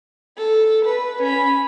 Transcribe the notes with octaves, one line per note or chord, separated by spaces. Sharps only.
A4
B4
C#4 B5